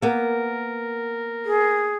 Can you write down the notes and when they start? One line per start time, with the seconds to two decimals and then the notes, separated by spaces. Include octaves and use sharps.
0.02 A#3 B3 A#4
1.45 G#4